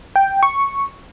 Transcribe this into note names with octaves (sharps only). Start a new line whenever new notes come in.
G5
C#6